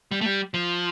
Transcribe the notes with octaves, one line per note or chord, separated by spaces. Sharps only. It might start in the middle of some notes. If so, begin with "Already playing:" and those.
G3
A3
G3
F3